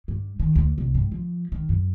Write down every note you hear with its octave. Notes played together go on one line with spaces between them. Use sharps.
G2
D#3
D2
C2
G2
F3
D#3
F#2